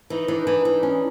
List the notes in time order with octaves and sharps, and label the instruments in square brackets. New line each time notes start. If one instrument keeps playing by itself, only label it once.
[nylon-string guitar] E3 [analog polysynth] D#4
[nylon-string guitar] E3 [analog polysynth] D4
[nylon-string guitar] E3
E3
C#4